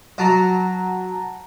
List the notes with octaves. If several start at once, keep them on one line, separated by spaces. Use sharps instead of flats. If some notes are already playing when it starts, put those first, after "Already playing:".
F#3 F#5 A5 A#5